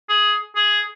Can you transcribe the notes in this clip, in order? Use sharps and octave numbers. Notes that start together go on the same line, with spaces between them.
G#4
G#4